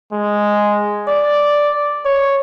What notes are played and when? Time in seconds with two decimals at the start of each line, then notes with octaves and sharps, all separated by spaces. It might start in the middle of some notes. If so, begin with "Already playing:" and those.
0.13 G#3
1.08 D5
2.05 C#5